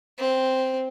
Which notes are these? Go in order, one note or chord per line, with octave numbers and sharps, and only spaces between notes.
C4